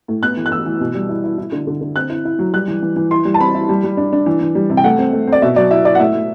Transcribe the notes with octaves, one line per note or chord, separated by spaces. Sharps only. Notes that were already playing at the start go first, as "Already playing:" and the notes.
A2
B3 F#6
E3
F#6
E3 E6
E3
B2
G3
E4
E4
E4
D3
D3
D3
C4 F#6
E4
E4
F#3
G3 F#6
E3
E3
E3
E4 C6
G3
A5
C4 B5
E4
G3
G3
D4
D4
E3
E3
G3
C3
G5
A3 F#5
C4
A3
C4
D5
B2 E5
F#3 D5
E4 E5
E4 D5
F#5
A2 E5
A2